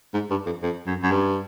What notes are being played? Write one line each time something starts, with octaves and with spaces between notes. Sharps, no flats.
G#2
G2
F2
F2
F#2
F#2
G2